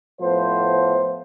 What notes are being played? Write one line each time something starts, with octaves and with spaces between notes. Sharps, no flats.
A2 F3 B3 C5